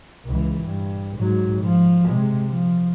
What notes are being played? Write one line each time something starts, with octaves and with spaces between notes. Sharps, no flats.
C#2 E3
G2
G#2 F#3
F3
C3 G#3
F3